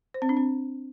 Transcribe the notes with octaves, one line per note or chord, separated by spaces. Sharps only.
C5
C4
D4
C4